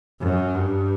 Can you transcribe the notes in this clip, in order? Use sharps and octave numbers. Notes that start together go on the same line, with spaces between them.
F#2
G2